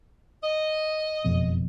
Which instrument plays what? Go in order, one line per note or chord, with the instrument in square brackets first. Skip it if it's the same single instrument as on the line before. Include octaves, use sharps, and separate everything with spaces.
[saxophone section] D#5
[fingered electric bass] F#1 F2 B2